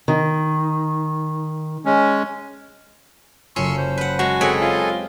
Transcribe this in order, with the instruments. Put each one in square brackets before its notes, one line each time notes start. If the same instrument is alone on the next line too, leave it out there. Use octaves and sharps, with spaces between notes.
[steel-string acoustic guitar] D#3
[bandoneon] G#3 C#4
[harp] F#1 F4 [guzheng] C#4 [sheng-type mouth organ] C6 C#6 E6
[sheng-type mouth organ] C5
[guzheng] B4 F#5
[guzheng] G#3 [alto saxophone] F#4
[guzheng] C4 B4 C#5 [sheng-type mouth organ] G#4 A4 D#5
[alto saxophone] F4 [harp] G4